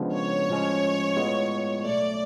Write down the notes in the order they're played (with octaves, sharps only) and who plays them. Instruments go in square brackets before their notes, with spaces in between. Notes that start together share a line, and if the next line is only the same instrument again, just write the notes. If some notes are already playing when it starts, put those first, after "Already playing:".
Already playing: [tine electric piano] C#3 F3 G#3 B3 D4
[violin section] C#5
[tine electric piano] A2 F3 G#3 C#4
A2 G#3 B3 F4
[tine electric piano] B1 B2 A3 [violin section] D5